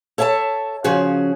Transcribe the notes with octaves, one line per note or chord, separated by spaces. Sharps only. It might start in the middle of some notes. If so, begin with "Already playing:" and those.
A4 C#5 E5 G5 A5
C#3 F3 C#4 F#4 G#4